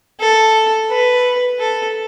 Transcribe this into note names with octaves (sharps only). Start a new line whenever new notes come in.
A4
B4
A4